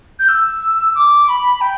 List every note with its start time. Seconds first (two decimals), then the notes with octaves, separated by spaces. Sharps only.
0.19 G6
0.29 E6
0.95 D6
1.28 B5
1.61 G5